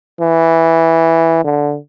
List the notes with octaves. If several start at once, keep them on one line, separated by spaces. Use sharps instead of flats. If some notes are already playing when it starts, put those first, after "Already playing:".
E3
D3